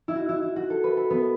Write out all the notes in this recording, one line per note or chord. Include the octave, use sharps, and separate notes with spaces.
E4
F#4
E4
E4
F#4
A4
B4
A4
B3